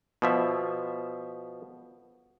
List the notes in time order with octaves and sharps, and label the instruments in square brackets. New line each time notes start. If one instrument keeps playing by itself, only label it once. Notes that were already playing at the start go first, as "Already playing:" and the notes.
[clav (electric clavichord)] B2 F3 E5